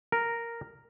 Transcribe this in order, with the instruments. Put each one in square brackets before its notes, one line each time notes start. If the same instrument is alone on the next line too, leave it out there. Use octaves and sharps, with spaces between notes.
[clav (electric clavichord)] A#4